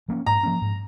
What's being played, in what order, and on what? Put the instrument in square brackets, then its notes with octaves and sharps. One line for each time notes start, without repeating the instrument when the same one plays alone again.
[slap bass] F3 A#3 C#4
[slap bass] G#2 [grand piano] A#5
[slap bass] F3 A#3 C#4
G#2